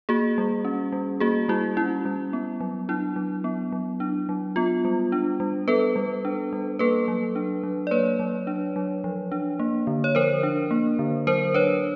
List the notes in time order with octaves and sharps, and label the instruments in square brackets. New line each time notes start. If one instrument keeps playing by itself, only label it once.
[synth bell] A#3 F#4 G#4
G3
C#4
G3
A#3 F#4 G#4
G3 E4 F#4
C#4 E4
G3
B3
F#3
D4 E4
F#3
B3
F#3
D4
F#3
B3 F4
G3
D4
G3
B3 A4 B4
G3
D4
G3
A#3 A4 B4
F#3
D4
F#3
D5
A#3 B4 C#5
F#3
D4
F#3
F3
D4
A#3
D3
C#5
F3 A#4 C5
D4
A#3
D3
F#3 A#4 C5
D4 B4 C#5